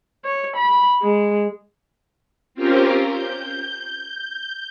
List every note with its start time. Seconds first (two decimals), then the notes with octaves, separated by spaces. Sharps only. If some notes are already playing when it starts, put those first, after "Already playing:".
0.25 C#5
0.56 B5
1.02 G#3
2.55 C4 C#4 F4 G4 A#4 C5
3.07 G6